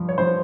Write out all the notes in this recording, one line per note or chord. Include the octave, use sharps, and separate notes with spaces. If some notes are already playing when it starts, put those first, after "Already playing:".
Already playing: G2 F3
C#5
F3 C5